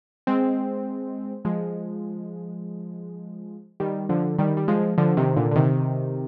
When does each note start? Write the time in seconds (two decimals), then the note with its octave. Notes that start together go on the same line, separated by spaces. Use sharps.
0.27 G#3 C4
1.45 F3 G#3
3.80 D#3 G3
4.09 D3 F3
4.39 D#3 G3
4.57 G3
4.68 F3 G#3
4.98 D3 F3
5.17 C3 D#3
5.36 A#2 D3
5.51 D3
5.56 C3 D#3